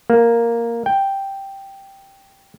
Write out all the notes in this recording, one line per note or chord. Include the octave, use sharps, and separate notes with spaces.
A#3
G5